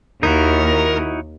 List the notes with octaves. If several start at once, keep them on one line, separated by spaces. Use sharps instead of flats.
D#2 D#4 E4 F#4 A#4